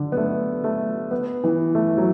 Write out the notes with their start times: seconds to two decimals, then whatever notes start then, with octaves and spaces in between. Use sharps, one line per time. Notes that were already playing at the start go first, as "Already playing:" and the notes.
Already playing: D3
0.12 B3
0.17 A3
0.64 A3
1.11 B3
1.44 E3
1.75 A3
1.98 F#3